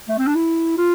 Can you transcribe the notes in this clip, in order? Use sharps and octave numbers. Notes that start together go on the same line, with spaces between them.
A3
C4
D4
E4
F4